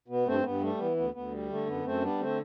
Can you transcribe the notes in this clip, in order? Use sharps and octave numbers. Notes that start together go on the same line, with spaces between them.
B2 B3
G2 A3 C4
A3
G2 B3
G3 A3
E3 B3
D2 B3
D2 B3
G3
D3 A3
F#2 B3
F#2 A3 C4
G3 B3 D4
D3 A3 C4